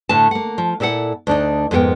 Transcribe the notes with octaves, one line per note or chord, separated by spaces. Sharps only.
A2 D3 A3 A5
A#3 F#5
F3
A#2 E4 A4 C#5 F#5
D2 D4 D#4
F2 G#2 B3 G#4 A#4 G5